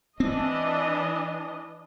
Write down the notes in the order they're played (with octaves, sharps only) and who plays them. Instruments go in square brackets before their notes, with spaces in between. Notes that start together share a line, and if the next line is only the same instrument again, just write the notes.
[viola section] E3 D4 D#5 [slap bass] C4